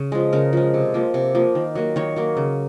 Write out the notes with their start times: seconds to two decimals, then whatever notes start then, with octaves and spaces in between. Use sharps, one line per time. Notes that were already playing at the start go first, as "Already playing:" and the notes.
Already playing: C#3
0.12 F3 G#3
0.33 C#3 A#4
0.53 F3 G#3
0.74 C3
0.94 F3 A#3
1.14 C3
1.35 F3 A#3
1.55 D#3
1.75 F#3 A#3
1.96 D#3 C#5
2.16 F#3 A#3
2.37 C#3